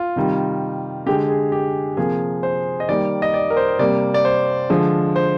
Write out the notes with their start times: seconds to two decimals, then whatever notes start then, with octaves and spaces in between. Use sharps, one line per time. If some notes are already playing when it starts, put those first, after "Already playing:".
Already playing: F4
0.16 C3 D#3 G3
1.06 D3 G#3 G4
1.29 G#4
1.52 G4
1.97 C3 F3 A#3 G#4
2.43 C5
2.80 D#5
2.89 D#3 G3 A#3 D5
3.22 D#5
3.34 D5
3.50 A#4
3.57 C5
3.79 C3 G3 A#3 D5
4.14 D5
4.25 C5
4.70 D3 F3 G#3
5.16 C5